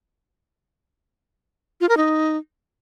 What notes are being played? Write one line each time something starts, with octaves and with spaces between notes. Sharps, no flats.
F4
A#4
D#4